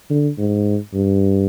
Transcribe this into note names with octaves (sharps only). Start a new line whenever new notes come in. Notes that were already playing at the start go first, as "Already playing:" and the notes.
D3
G#2
G2